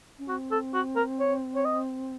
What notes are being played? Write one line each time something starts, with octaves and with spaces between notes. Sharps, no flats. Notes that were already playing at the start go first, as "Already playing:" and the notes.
C#4
C4 F#4
A4
F#4
A#4
C#5
C#5
D#5